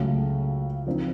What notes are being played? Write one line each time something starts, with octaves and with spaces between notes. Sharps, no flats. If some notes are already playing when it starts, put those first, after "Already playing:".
Already playing: C#2 C#3 F#3 A3
F3 C4 D#4